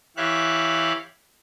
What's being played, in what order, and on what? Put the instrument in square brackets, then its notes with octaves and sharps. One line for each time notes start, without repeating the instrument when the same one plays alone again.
[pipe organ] E3 G4 C#5 E5 F5 F#6